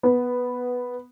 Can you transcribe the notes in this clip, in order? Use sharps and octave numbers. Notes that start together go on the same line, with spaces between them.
B3